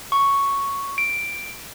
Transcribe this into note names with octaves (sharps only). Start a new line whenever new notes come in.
C#6
D7